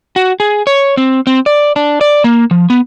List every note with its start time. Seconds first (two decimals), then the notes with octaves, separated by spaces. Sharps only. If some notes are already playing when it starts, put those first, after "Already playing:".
0.16 F#4
0.40 G#4
0.67 C#5
0.97 C4
1.27 C4
1.46 D5
1.76 D4
2.01 D5
2.24 A#3
2.51 F3
2.70 B3